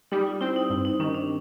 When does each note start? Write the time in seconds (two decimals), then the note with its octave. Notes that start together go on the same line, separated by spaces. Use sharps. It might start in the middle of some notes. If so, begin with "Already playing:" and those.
0.12 G3 D#4
0.27 F4
0.41 C4 E4
0.56 D#4
0.70 G2 E4
0.85 D#4
1.00 D#3 C#4
1.15 D4